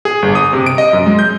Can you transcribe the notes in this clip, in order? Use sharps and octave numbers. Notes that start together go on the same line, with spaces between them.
G#4
G1
D#6
C3
D7
D#5
F#2
G#3
G6